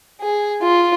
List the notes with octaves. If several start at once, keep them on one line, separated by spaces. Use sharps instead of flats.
G#4
F4